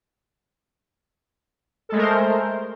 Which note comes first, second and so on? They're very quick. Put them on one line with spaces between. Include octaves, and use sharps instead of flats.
A4 G#3 A3 A#4 C5